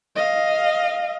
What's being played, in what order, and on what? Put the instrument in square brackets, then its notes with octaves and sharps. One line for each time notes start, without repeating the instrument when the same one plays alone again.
[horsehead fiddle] D#5 F5